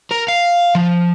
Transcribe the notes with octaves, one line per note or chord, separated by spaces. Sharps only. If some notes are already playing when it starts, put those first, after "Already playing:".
A#4
F5
F3